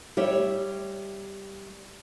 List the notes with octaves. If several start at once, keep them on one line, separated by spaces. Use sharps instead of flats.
G3 C#5 E5